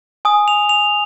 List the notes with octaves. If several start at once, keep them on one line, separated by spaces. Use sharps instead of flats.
G#5 D#6
F7
F7